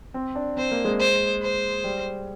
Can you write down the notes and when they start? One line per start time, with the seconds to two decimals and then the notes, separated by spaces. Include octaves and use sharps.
0.14 C4
0.36 D4
0.57 C4 C5
0.71 A#3
0.85 G#3
0.99 C5
1.42 C5
1.84 G3